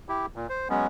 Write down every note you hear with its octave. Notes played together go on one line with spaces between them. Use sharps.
E4 G4
A#2
C5
F#3 G#3 B3 C#4